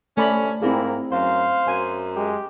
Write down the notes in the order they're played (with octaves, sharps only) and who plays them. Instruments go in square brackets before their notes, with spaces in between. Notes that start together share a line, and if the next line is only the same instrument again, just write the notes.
[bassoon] C3 [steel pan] A3 D5 B5 [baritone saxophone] C#4
[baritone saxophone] G#2 [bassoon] A#3 [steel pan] C4 E4 G#4
[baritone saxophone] F#2 [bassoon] C5 [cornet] F5
[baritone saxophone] F#2 [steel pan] G#5
[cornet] G#3 [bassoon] G4